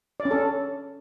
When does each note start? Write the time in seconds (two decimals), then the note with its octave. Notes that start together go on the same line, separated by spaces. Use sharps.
0.20 D5
0.25 C#4
0.31 A4